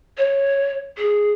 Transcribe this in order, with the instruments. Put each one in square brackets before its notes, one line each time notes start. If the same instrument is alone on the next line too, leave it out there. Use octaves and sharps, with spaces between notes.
[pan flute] C#5
G#4